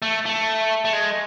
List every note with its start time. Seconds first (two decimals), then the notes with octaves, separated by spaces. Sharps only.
0.02 A3
0.26 A3
0.85 A3
0.93 G#3